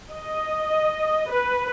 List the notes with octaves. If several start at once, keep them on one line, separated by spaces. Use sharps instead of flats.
D#5
B4